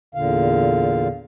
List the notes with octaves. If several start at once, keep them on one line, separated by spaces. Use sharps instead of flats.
E2 A#2 D3 F5